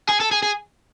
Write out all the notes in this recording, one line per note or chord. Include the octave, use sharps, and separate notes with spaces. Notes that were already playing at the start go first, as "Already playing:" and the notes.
G#4
A4
G#4
G#4